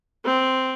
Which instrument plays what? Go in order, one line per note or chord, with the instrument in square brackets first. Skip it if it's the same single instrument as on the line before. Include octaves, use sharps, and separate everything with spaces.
[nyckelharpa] C4